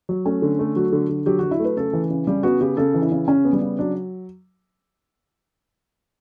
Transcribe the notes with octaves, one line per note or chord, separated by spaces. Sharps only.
F#3
A3 C#4
D3
A3
F#3 F#4
D3
D3
F#3 G4
F#3 F#4
E4
A3 B4
C#3 A4
E3
C#3
C#3 G3
B3 F#4
C#3 G4
C#3 A4
E3
E4
C#3
C#3 C#4
B3
G3
C#3
F#3 D4